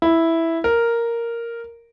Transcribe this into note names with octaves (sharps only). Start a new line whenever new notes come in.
E4
A#4